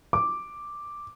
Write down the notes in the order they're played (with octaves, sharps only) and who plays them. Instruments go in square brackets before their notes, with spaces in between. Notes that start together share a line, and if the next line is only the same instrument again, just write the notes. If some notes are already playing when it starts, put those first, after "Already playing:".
[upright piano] D6